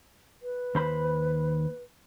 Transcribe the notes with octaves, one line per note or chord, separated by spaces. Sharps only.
B4
D#2 C5 B5